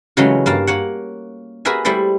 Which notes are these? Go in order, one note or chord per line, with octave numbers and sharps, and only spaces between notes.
C#3 E3 F#3 G#3 A3 C#4
G2 A#3 F5 A5
A#3 C#5 F#5
F#4 G#4 A#4 B4 E5 G#5
G3 A3 E4 C5 D5